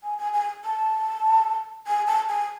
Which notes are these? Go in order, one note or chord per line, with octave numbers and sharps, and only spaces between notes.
G#5
G#5
G#5
A5
G#5
A5
G#5